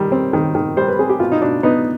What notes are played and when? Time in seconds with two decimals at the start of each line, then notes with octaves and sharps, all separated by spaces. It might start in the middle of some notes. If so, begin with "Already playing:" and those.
Already playing: D#3 G3
0.12 C4
0.33 D#3
0.55 D#3
0.77 G3 C5
0.88 B4
0.99 C4 G#4
1.09 G4
1.20 B2 F4
1.32 D#4
1.42 B2 D4
1.63 B3 D#4